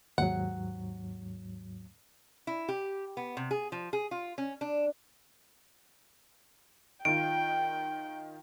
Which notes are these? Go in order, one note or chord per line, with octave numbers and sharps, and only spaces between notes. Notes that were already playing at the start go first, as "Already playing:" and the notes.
D#2 G#2 F#3 F#5
E4
G4
B3
C3
G#4
F3
G#4
F4
C#4
D4
D#3 F4 G5 D7